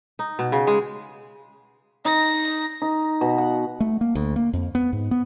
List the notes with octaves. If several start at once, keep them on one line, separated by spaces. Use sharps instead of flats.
D#4
B2
C#3
G#3
D#4 A#6
D#4
B2
F#5
A3
A#3
D2
A#3
F2
B3
G#2
B3